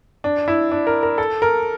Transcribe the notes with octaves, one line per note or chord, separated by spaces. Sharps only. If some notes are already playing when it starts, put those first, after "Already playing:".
D4
E4
D4
A#4
A#4
A4
A#4